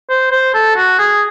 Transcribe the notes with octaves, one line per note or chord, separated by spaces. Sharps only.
C5
C5
A4
F#4
G#4